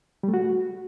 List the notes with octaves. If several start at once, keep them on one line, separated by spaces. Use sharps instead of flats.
G3
A3
F#4